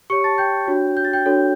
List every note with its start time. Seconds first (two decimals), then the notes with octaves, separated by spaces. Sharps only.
0.10 G4 C#5 C#6 C#7
0.24 A5 A6
0.38 G5 G6
0.67 D4 F#4 C#5
0.97 G6
1.05 A6
1.13 G5 G6
1.26 D4 F#4 A4 C#5